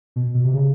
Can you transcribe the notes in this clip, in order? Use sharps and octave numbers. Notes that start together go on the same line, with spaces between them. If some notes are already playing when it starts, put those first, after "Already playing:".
B2
B2
C3
C#3